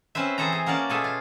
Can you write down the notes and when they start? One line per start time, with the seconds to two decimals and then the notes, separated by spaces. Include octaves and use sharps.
0.15 C4 C#4 B4 C5 E5
0.38 E3 C4 G#4 A4 C5 A#5
0.53 G#4
0.66 A#3 C#4 F#4 A#4 D5 A5
0.90 B2 F4 G#4 A4 E5
1.04 F4